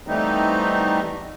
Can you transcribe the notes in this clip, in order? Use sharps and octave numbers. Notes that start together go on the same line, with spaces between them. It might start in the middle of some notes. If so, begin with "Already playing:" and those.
E3 G3 A3 B3 C4 D#4